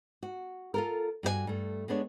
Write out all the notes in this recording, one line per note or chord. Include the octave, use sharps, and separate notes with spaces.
F#4
F4 A4 A#4
G2 F#4 A#4 G#5
G2 A3
G#3 B3 D4 C#5